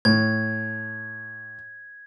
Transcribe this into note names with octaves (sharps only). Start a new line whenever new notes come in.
A2 G#6